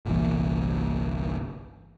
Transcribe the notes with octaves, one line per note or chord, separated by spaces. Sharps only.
G1 C2 A#2 E3